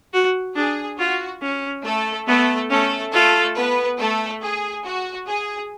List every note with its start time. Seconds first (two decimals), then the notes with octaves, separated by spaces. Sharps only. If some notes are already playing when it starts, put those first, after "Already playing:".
0.14 F#4
0.55 D4 G#4
0.98 F4 F#4
1.42 C#4
1.84 A3 A4
2.27 A3 B3 A4
2.70 A3 C#4 A4
3.13 A3 F4 A4
3.56 B3 B4
3.99 A3 A4
4.42 G#4
4.84 F#4
5.27 G#4